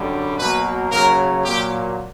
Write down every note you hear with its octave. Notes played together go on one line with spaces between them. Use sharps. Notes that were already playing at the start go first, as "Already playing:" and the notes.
Already playing: F#2 D3 G3
B2 F#3 A#3 B4
C#3 F#3 A#3 A#4
A#2 F#3 A#3 G4